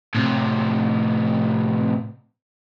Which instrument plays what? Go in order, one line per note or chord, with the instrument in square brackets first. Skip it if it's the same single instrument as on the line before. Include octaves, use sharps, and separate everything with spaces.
[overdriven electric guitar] A2 C3